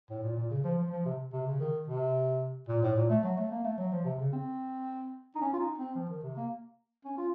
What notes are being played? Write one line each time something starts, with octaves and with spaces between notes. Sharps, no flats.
A2
A#2
A#2
C#3
F3
F3
F3
C3
C3
C#3
D#3
C3
A#2
A2
A#2
A3
F#3
A3
A#3
A3
F#3
F3
C3
C#3
C4
D#4
C#4
F4
D#4
C4
F3
D#3
C3
A#3
C#4
F4